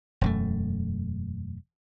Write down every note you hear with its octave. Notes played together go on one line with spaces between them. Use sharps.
E1 F#2 A3